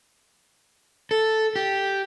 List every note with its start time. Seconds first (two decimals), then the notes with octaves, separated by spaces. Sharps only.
1.11 A4
1.56 G4